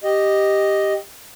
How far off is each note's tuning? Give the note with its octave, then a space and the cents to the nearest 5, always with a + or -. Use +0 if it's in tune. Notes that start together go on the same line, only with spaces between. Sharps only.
G4 +0 D#5 +0